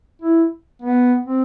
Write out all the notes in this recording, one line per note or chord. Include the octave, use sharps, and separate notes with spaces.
E4
B3
C4